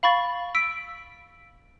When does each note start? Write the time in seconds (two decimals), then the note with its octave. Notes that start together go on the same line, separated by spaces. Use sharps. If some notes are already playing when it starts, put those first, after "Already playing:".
0.03 F5 B5 C#6 A6
0.55 E6 B6 D7